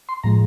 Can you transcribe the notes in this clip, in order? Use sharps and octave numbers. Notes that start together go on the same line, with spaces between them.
C6
A2 F3 G#3 A#5